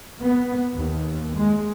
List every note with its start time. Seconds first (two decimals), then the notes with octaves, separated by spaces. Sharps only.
0.22 B3
0.75 D#2
1.34 G#3